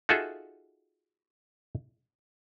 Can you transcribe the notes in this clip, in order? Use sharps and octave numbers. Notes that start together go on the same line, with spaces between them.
D#4 F4 F#4 G#4 A4 E5